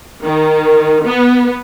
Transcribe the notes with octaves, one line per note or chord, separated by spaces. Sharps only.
D#3
B3